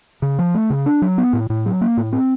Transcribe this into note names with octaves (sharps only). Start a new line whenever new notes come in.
C#3
F3
A3
C#3
D4
F#3
B3
A2
A2
F#3
A#3
A2
C4